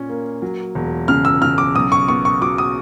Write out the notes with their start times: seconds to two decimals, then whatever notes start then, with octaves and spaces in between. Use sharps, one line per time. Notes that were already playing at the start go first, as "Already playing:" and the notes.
Already playing: A#2 C#4
0.09 A#3
0.42 F#3
0.75 E1
1.08 C#3 F6
1.25 E6
1.42 C#3 F6
1.58 D6
1.75 B1 D#6
1.92 C#6
2.08 B3 C#6
2.25 C#6
2.41 F#3 D6
2.58 D#6